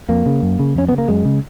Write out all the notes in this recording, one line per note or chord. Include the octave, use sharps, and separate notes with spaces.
F2 A#3
C#3
F#2
C#3
F2 C#4
C#3 B3
A#3
F#2 G#3
C#3